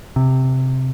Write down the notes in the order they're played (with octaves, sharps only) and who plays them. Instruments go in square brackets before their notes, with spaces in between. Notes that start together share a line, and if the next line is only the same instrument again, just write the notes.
[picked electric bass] C3